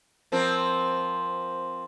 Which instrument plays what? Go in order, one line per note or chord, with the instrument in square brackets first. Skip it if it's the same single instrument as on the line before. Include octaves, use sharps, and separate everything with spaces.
[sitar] F3 C4 A#4